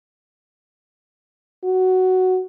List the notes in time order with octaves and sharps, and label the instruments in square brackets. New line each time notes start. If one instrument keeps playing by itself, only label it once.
[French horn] F#4